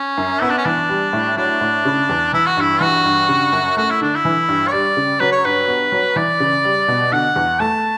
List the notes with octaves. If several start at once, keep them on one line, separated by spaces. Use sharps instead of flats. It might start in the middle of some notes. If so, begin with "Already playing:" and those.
Already playing: C#4
F#2
B3 E4
D4
C#4
E3 D4
G3
A2
F#3 D4
A2
C#3
E2
E3 E4
F#4
G2 E4
E3 F#4
G2
C#3
F#2
A3 F#4
E4
D3 D4
E4
E3
G2
C#5
G3 D5
C#3
F#3 B4
C#5
G2 B4
B3
F#3
E3 D5
C#3
G3
B2
D3 F#5
E2
A3 A5